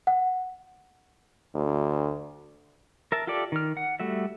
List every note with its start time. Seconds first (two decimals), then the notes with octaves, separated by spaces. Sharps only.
0.07 F#5
1.55 D2
3.12 A#4 E5 A5
3.27 F4 G4 A4 D5 E5
3.52 D#3 F6
3.77 F#5
4.00 G3 A3 F#4 E5